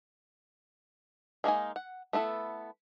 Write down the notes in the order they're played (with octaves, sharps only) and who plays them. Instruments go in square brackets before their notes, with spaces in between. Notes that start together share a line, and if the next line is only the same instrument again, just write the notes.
[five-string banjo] G#3 A#3 D#4 G#5
F#5
A3 B3 E4 A4